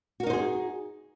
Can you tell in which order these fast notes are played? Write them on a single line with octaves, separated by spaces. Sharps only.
F#4 A#4 D#4 C5 G#4